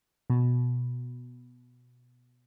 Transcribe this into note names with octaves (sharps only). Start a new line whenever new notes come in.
B2